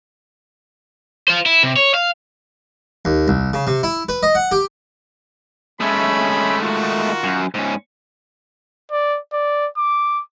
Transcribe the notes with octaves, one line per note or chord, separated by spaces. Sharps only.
F4 C5
E4
C3
C#5
F5
D#2
C2
C#3
C3
E4
B4
D#5
F#5
G4
G#3 A3 C#4 E5 B5
D#3 F4 F#4
F#2
G#2 C#4
D5
D5
D6